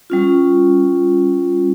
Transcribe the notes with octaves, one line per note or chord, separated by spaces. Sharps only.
G3 C#4 F4